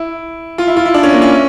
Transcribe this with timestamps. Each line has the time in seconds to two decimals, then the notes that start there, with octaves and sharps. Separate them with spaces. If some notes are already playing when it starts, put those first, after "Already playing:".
Already playing: E4
0.58 F4
0.67 E4
0.77 F4
0.85 E4
0.94 D4
1.03 C#4
1.13 A#3
1.22 C#4